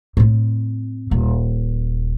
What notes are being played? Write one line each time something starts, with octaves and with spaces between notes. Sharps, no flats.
A2 C4
D#1